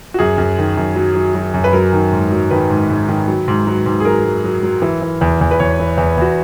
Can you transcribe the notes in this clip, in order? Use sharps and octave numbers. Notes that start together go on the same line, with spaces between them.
F#4
F#2 G#4
F#2
D#3
F#2
F#3
F#3
F#3
F#2
B4
F#3 A#4
D#3
G#2
F#3
D#3 B4
G#2
G#2
D#3
F#3
G#2
F#3
G#2
G#4
F#3 A#4
F#3
F#3
F#3
E3
E3
E2
E2
B4
E2 C#5
E3
E2
E2 F#4